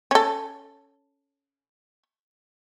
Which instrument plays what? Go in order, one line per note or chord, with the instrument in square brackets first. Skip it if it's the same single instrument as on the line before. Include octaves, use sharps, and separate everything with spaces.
[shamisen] C#4 A4